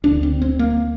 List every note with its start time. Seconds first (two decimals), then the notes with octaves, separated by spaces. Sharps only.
0.04 D2 D3 D4
0.23 C4
0.42 C4
0.59 A#3